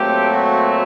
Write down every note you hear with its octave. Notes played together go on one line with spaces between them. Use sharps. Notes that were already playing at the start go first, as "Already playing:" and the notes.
Already playing: A#2 F#3 A3 C4 G4
F#4